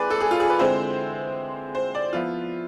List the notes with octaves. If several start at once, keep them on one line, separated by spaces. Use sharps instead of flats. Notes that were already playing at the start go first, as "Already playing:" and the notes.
Already playing: E3 G#3 C4 G#4 B4 D5
A4
G#4
F4
G#4
B4
D3 G#3 C4 E4 C5
C5
D5
F3 B3 E4 F4